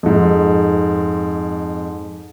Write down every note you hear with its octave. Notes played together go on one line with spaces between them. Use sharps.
F2 G#2